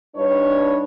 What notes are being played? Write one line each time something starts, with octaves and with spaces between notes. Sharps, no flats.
G2 D4 D#4 B4 C#5